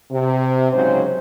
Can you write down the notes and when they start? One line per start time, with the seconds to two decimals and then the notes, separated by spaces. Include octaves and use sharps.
0.11 C3
0.72 G#2 C#3 F#3 C5